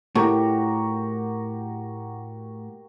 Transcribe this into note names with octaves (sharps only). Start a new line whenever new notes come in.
A2 F#4 G4 A#4